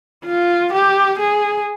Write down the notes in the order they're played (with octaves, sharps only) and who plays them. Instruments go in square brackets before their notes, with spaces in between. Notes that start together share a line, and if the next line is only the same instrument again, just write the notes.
[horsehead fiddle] F4
G4
G#4